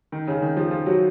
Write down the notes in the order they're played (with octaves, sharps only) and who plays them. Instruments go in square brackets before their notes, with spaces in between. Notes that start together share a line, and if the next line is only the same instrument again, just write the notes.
[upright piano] D#3
C#3
D#3
F3
F3
F#3